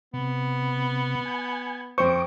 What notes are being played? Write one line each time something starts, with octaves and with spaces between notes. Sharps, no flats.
C3 B3
G#5
F2 C5 C#6 D6